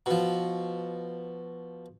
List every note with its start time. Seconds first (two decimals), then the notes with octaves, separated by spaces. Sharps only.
0.06 B2 F3